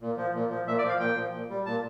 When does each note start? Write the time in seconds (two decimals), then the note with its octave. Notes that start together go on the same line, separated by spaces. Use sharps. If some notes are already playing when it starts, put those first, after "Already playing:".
0.01 A#2
0.17 F3
0.34 A#2
0.50 F3
0.67 A#2 E5
0.78 D5
0.84 F3 F5
1.00 A#2 G5
1.16 F3
1.33 A#2
1.49 G3
1.66 A#2 A5